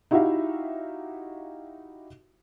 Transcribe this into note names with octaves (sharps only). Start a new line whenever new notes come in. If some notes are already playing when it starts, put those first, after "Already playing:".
D#4 E4 F#4 G4 E5 F5